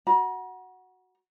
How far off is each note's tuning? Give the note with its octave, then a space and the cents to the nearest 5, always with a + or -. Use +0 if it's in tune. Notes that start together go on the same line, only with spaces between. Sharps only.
F#4 +0 A#5 +45